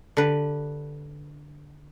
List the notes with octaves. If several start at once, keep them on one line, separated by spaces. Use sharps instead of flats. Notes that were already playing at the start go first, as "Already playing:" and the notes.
D3 G4 B4